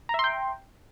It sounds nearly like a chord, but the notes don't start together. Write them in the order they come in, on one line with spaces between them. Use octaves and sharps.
A#5 E5 C6 G5